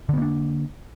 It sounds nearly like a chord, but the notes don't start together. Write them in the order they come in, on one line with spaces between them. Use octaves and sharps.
D3 B3 A#3 D4